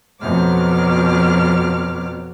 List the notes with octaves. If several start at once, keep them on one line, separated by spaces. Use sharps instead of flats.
F2 B2 F#3 D6 F6